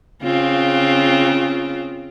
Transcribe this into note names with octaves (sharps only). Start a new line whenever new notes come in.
C#3 C4 F4